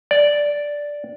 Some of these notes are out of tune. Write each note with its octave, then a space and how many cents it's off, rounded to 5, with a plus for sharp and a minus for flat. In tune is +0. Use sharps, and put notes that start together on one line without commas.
D5 -5